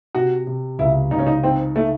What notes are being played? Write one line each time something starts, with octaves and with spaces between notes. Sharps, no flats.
C3 F#4
C3
C#2 E4
C#2 D#4
C#4
D#4
C4 D#4
A3 D#4